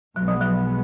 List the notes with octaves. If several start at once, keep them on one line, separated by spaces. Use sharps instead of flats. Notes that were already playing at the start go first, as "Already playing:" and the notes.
B1 B2 F#3 G#3 B3
F3
F#3